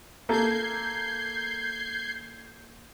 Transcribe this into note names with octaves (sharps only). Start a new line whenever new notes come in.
A#3 A4 G6 G#6 C7